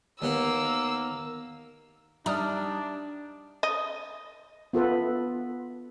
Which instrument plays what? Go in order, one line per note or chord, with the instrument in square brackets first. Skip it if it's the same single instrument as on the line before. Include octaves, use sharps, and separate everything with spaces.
[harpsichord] D#2 B3 F#5 [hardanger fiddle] A#3 [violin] E6
[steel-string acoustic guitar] G3 [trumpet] D4 [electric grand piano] D#4 D5 E5 [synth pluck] A#5 D#6 F6
[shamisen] D#5
[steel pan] B3 F4 A4 B4